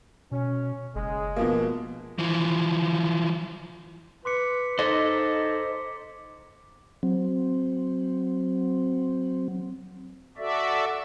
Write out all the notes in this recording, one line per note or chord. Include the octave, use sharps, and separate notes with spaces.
B2 C#4
F#1 G#3
B2 F3 A#3
E3 F3
B4 C6 D6 C#7
D#4 A4 C5 D#5 D6 B6
F#3 C4
F#4 A4 D5 E5